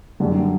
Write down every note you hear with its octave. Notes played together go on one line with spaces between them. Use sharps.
F#2 D3 G3